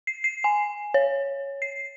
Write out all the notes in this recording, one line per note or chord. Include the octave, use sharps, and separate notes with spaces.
C7
C7
G#5
C#5
C7